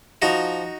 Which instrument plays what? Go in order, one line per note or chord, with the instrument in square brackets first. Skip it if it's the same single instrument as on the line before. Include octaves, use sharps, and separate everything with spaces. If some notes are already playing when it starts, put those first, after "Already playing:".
[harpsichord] F3 D#4 F#4